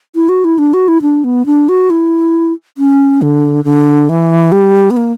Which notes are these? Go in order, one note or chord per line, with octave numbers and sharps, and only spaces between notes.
E4
F#4
E4
D4
F#4
E4
D4
B3
D4
F#4
E4
C#4
D3
D3
E3
G3
B3
A#3